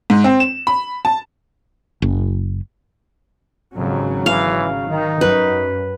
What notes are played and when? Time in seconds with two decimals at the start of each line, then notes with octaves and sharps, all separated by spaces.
0.10 G#2
0.24 C4
0.40 E7
0.67 B5
1.05 A5
2.02 F#1
3.75 G#1 F2 C#3 F#3
4.26 E3 F5
4.88 D#3 D#4
5.21 F#2 B4